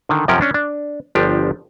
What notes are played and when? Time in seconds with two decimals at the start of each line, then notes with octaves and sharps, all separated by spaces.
0.09 D3 D#3
0.28 F#2 C3 F3 C#4 A#4 G5
0.41 C#4 D4
0.54 D4
1.15 G1 F3 D4 G4